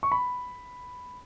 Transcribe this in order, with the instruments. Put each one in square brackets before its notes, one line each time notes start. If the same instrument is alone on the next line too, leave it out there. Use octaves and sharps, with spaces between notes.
[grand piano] C#6
B5